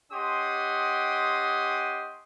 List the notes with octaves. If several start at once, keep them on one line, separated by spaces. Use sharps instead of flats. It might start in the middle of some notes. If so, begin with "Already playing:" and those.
C#4 G4 D#5 F#5 C6 D#6